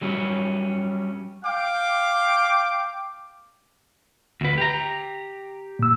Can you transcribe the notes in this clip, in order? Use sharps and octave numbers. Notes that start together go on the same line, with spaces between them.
F#3 G3 C#4
F5 G5 D6
D2 B4
G4 A#5
A#2 E6